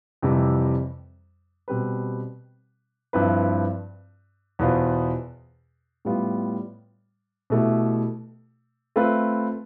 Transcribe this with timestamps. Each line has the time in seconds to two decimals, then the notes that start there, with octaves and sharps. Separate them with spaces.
0.22 F2 C3 E3 G3
1.68 B2 G3 C4 G4 B4
3.13 G2 F3 C4 E4 B4
4.59 E2 B2 B3 F4 C5
6.05 A2 G3 B3 F4
7.50 B2 A3 E4 G4
8.96 A3 C4 F4 B4